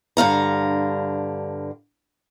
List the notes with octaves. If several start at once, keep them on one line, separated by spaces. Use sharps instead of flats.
G2 D3 F5 A#5